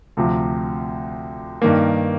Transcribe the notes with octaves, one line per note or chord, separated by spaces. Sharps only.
D2 C3 F3
G2 D#3 A#3